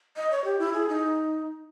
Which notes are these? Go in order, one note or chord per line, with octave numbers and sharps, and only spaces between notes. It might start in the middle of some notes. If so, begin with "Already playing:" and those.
D#5
C#5
G4
E4
G#4
D#4